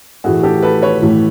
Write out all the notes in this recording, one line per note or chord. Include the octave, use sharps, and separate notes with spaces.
A2 E3 A3 F#4 G#4
G4 A4
A4 B4
B4 C#5
A2 E3 A3